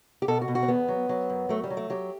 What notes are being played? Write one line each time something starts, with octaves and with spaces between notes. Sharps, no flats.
G4
B2 A4
F#4
B2
F#4
C4
E2 B3
F#3
F#3
F#2
F#3 A3
G3
F#3
A3
F#3 G4